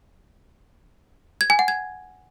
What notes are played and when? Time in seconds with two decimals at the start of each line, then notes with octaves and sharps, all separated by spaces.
1.41 G#6
1.50 G#5
1.59 F#5
1.68 G#6